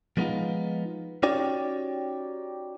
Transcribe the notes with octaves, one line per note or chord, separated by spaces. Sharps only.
F3 G#3 A#3 B3 D#4 F4
C#4 D#4 F#4 G4 C#5 D5